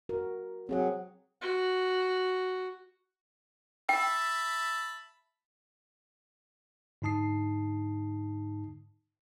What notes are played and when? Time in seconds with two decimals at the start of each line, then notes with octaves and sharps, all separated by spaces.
0.09 F#4 A#4
0.69 F#3 C4 G#4 F#5
1.41 F#4
3.89 E5 G5 A5 B5
7.02 G#2 D3 D#4 A5 D#6 C7